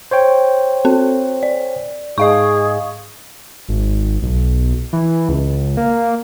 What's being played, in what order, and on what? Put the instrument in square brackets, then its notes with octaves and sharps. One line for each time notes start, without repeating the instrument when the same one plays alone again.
[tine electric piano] C5 C#5 G5
[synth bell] C4 A4
D5
[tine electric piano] G#2 [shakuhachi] G#4 [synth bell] D#5 F5 C#6
[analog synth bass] G#1
B1
E3
C#2
A#3